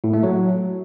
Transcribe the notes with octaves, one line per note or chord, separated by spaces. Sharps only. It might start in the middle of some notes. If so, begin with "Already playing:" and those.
A2
A3
F#3